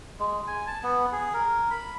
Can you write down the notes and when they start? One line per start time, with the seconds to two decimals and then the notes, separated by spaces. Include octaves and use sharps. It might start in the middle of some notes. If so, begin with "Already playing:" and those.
0.19 G#3
0.47 G#5
0.67 A5
0.83 B3
1.12 G#4
1.34 A#4
1.71 B5